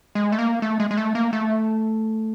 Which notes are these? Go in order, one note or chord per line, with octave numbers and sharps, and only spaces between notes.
G#3
A3
A#3
A3
G#3
G#3
A3
A#3
A3